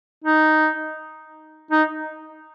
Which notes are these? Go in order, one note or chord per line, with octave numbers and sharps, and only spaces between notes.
D#4
D#4